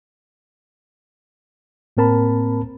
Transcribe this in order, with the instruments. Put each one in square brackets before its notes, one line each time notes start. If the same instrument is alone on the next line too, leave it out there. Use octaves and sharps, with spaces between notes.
[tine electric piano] A2 A#3 C4 A#4 A5 B5